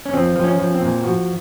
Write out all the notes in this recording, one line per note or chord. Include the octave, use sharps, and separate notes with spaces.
C#4
F3 C4
F3
C#4
F3
C4
A#2
F3 F#4